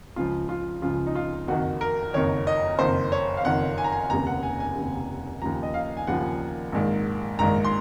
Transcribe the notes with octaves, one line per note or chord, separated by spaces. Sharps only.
C#2 C#3 F3 F4
F4
C#2 C#3 F3 F4
D#4
F4
F#1 F2 D#3 F#4
A#4
F#1 F2 D#3 C#5
D#5
F#1 F2 D#3 C5
C#5
F5
F#1 F2 D#3 F#5
G#5
A#5
G#5
F1 D#2 C#3 A#5
F#5
G#5
G#5
F1 D#2 C#3
D#2 C#3 F3 A#5
D#5
F5
G#5
D#2 C#3 F3 F#5
A#1 G#2 D#3
A#1 G#2 D#3 A#5
C6